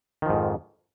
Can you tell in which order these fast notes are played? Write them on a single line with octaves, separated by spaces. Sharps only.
D#3 F3 G#2 F2